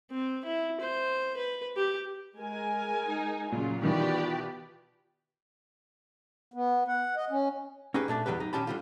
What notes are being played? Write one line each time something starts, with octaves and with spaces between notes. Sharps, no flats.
C4
E4
C5
B4
G4
G#3 A#4 G#5
D#4
A#2 C#3 F#3 F4
B2 D#3 E3 F4 G4 B4 D5
B3
F#5
D#5
C#4
C#4 D#4 G4 G#4 B4
A#2 A3 D4 D5
E2 B2 F#3 G3 G4 B4
D#4
A#2 D#3 C#4 G4 A5 B5
D3 G3 F4